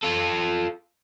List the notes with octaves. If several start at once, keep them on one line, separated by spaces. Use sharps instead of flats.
F4 A4